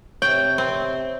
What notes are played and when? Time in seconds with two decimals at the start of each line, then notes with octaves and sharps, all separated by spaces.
0.22 C3 C#5 G5
0.58 C4